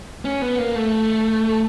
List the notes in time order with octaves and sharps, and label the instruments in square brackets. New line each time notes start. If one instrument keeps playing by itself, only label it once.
[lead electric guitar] C#4
B3
A#3
A3